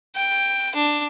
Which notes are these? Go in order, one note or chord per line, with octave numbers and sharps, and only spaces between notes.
G5
D4